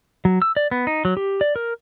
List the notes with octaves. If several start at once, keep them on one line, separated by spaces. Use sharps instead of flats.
F#3
E6
D5
B3
D#4
F#3
G4
D5
A#4